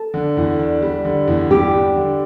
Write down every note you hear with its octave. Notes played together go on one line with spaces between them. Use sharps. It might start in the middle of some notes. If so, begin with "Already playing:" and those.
Already playing: A4
D3
E2
D4
G3
D3
E2
G3 G4
D4
D3